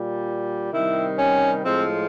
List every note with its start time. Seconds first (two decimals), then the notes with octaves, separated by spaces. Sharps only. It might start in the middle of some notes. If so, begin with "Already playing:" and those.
Already playing: A#2 G3
0.73 C3 D#3 G3 E4
1.18 C#4
1.64 A2 F3 G#3 C4